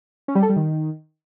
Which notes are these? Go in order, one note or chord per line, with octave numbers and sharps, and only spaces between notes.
C#4
G3
A4
G3
D#3